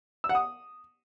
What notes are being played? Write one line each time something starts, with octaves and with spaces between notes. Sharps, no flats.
E6
F#5
D#6